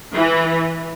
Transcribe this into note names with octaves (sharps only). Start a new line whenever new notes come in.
E3